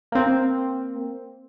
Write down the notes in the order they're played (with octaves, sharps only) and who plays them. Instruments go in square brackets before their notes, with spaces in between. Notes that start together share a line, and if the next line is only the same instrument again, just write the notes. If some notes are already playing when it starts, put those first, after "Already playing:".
[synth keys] A#3 C4